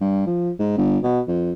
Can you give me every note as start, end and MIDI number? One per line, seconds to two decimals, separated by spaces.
0.01 0.24 43
0.27 0.50 53
0.59 0.75 44
0.78 0.98 31
1.03 1.20 47
1.28 1.52 41